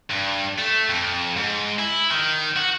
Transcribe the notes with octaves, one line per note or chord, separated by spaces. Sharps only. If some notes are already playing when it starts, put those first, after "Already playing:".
G2
A3
F2
G#2
E4
D#3
F#4